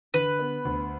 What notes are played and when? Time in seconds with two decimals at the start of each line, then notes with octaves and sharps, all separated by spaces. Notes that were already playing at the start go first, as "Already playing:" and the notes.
0.14 D3 B4
0.39 B3
0.65 D2